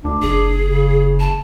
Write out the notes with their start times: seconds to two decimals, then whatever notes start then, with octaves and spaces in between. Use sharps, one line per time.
0.05 D2 D4
0.22 F#1 G#4
0.64 C#3
1.20 A5